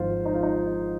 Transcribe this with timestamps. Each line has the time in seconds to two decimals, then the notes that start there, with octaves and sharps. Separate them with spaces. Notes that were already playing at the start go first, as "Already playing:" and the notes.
Already playing: G#1 G#2 F3 F4 C5
0.25 D#4
0.34 F4
0.43 D#4